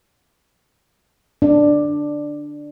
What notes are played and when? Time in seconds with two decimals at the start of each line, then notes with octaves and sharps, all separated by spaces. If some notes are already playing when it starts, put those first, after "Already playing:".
1.42 D4 D5